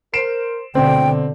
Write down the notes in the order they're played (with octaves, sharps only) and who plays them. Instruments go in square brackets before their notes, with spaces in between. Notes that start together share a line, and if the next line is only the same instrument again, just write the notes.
[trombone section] A#4 C5 [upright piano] C7 D7 E7
[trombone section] D2 [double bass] B2 D3 [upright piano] C4 [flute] G5